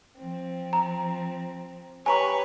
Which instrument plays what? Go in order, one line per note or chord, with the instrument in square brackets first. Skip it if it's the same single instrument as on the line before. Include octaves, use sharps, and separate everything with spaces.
[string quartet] F3 C4
[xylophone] A#5
[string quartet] G4 B4 C#5 [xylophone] G#5 A#5 C#6